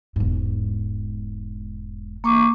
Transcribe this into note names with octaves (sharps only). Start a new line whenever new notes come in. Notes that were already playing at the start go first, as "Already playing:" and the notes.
E1 G#2
A#3 C#6 D6